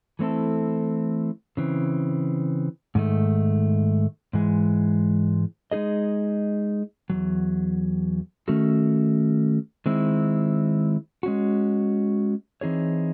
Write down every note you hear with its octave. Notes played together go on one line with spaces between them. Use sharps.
E3 A3 C4 E4 A4
C#3 E3 C4
G#2 D#3 A3
G#2 E3 G#3
G#3 D#4 G#4 D#5
E2 C3 F#3
D#3 A3 C#4 F#4 A4
D#3 G#3 C4 E4
G#3 C#4 F#4
E3 C4 D#4 G#4 C#5